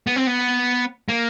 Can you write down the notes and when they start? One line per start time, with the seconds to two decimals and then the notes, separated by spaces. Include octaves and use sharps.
0.07 B3
0.16 C4
0.27 B3
1.09 A#3